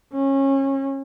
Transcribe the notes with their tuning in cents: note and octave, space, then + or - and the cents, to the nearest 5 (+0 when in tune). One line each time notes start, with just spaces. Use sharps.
C#4 -25